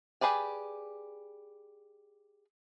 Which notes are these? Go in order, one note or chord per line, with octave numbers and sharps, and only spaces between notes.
G4 G#4 B4 D5 G#5